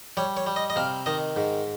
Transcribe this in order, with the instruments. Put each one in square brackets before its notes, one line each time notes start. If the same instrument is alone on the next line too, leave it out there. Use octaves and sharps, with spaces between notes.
[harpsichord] G3 C#5
C#5
G3
D#5
D#5
C3 F5
D#3 D#5
G#2